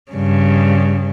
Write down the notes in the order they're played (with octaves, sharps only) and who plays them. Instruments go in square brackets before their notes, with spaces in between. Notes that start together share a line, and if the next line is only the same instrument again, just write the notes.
[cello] G2 C#3